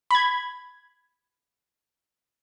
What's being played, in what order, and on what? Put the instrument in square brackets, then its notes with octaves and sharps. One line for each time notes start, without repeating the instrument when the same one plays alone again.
[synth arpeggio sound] B5 G#6